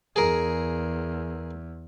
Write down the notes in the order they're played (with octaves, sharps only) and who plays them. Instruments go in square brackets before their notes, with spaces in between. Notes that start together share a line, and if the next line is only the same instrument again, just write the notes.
[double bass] E2 [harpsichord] G#4 A#4